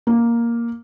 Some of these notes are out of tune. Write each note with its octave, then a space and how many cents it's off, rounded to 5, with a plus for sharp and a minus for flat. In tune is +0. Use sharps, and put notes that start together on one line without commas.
A#3 +5